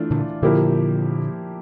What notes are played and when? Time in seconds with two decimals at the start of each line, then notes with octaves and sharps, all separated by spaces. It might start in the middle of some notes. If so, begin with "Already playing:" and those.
Already playing: E3 A3 D4 F4
0.11 A#2 D3
0.42 A#2 D3 F3 A#3 E4 G4